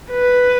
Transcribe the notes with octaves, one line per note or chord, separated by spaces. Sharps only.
B4